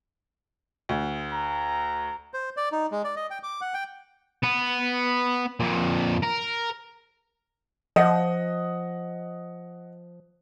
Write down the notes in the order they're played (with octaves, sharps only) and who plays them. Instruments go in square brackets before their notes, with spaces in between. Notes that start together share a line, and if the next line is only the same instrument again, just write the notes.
[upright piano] D2
[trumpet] A#5
[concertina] C5
D5
D#4
G#3
D5
D#5
G5
D6
F#5
G5
[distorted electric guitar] B3
F2 A#2
A#4
[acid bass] F3 [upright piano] D#5 F#5